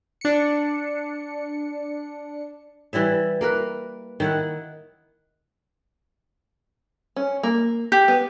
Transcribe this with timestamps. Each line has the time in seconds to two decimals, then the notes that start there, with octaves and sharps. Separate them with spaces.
0.21 D4 C#7
2.93 E3 G3 E4 E5
3.41 A#3 A#4 B4
4.20 D#3 E4 F#5
7.16 C#4
7.43 A#3
7.92 G4
8.08 B3